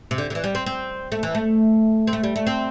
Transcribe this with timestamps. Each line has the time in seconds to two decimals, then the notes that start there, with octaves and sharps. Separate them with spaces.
0.11 C3
0.18 D3
0.30 D3
0.35 E3
0.44 G3
0.55 C4
0.66 C4
1.12 A3
1.23 E3
1.35 A3
2.07 C4
2.13 A3
2.23 G3
2.36 A3
2.47 C4